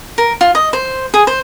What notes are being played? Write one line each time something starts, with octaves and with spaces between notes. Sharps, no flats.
A#4
F4
D#5
C5
G#4
C5